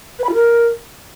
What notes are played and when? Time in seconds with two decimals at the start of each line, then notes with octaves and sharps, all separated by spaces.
0.19 B4
0.24 B5
0.29 F4
0.34 A#4